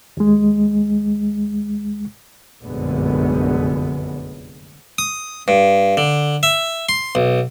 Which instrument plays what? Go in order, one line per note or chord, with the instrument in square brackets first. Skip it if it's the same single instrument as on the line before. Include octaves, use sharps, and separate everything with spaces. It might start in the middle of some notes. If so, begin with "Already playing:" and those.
[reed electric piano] D#2 G#3
[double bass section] F1 A#1 F#2 D3 G#3 B3
[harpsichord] D#6
G2
D3
E5
C6
B1